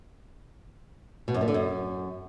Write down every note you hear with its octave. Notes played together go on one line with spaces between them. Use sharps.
B2
F#2
A#2
D3
F#2